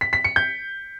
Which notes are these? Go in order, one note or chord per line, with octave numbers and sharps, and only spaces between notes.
B6
B6
C#7
G6